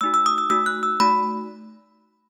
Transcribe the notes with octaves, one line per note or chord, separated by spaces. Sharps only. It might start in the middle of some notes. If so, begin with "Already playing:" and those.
A3 D#4 F#4 E6
E6
D#6
E6
A3 D#4 F#4 E6
F#6
E6
A3 D#4 F#4 B5